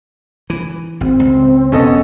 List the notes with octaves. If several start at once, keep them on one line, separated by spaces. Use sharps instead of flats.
E3
G#1 C4
C#2
E1 B3 C#4 A4 D#5